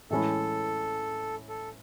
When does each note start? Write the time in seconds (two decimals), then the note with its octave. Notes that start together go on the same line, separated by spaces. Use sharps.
0.10 A2 E3 G#3 C#4 E4 A4
1.49 A4